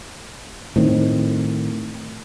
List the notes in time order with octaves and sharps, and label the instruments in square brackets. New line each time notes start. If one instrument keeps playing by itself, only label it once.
[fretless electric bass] A2 D#3 C4